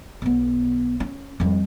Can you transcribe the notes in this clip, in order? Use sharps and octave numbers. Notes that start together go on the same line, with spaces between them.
B1 B3
C#4
F2 G3